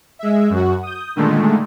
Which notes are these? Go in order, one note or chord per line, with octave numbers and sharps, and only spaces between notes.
G#3 E5
F#2 F#4
D#6 G6
A#2 D3 D#3 G#3 A3